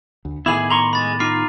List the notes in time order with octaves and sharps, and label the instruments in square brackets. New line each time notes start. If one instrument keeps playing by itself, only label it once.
[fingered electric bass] D2
[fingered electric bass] A2 D#3 B3 [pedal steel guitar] E4 G#4 [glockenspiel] B5 D6 F#7
[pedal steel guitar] A#5 C6 C#6 [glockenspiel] F#7
[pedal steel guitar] G#3 [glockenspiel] B5 A6
[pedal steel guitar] D#4 F4 [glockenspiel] D6 F6 C7